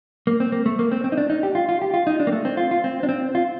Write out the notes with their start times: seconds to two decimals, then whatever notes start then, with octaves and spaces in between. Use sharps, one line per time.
0.27 A#3
0.40 C4
0.52 A#3
0.66 A3
0.79 A#3
0.91 C4
1.04 C4
1.12 D#4
1.18 D4
1.30 D#4
1.43 G4
1.55 F4
1.69 F4
1.82 G4
1.94 F4
2.07 D#4
2.20 D4
2.27 A#3
2.33 A3
2.45 C4
2.57 F4
2.71 F4
2.84 C4
3.03 D4
3.09 C4
3.35 F4